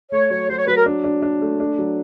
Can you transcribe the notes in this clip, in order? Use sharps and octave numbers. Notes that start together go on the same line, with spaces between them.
A3 C#5
F#3 C#5
F#3 C5
C#5
F#3 B4
A#4
D4
D4
D4
A3
D4
F#3